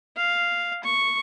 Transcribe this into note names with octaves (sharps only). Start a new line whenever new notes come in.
F5
C#6